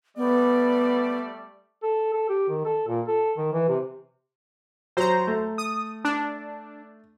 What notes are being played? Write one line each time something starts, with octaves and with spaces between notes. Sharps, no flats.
G3 A3 B3 D5
A4
A4
G4
D#3
A4
A#2
A4
D#3
E3
C3
F#3 C5 A#5
A3
D#6
D4